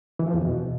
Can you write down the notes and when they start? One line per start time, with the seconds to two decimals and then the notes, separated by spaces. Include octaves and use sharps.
0.19 E3
0.27 F3
0.34 E2
0.41 B2